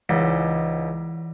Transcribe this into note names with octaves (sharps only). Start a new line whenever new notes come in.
C#2 G#2 E3 D5 F#5